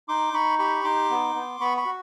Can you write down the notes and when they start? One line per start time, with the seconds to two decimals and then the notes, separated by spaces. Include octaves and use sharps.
0.09 D#4 C6 D6
0.33 D#4 B5 C#6
0.59 G4 B5 C#6
0.84 D#4 C6 D6
1.10 B3
1.35 B3
1.60 B3 B5 C#6
1.77 B5 C#6
1.85 F#4